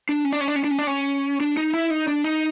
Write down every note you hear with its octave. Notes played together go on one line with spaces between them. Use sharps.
D4
C#4
D4
C#4
D4
C#4
D4
C#4
D4
C#4
D4
D#4
E4
D#4
D4
D#4